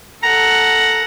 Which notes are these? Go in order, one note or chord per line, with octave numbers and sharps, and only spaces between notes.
A4 F#5 A#5